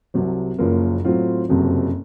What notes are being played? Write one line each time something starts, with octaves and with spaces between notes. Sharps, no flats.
C2 C3 F#3
F#1 F#2 F3 A#3
A2 F#3 C4 F4
F#1 F2 C3 F#3